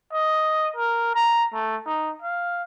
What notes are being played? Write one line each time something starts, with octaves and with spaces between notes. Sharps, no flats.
D#5
A#4
A#5
A3
D#4
F5